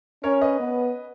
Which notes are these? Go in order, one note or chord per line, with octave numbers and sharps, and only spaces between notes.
C#4 A#4 C#5
B4 D#5
B3